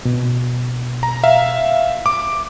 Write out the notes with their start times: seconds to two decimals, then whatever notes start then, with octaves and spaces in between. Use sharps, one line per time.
0.05 B2
1.03 A#5
1.24 E5 F5
2.06 D6